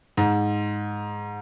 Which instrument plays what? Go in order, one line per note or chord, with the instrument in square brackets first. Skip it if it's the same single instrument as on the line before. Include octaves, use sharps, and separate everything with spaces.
[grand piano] G#2